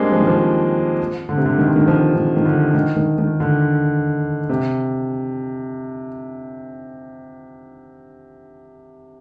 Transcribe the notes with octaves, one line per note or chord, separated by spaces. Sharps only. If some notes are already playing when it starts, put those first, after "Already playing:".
Already playing: G3 G#3 A#3 C4 D4
F3
D#3
F3
D3
C3
D3
D#3
D3
D#3
F3
D#3
D#3
D3
D#3
D#3
D#3
D3
C3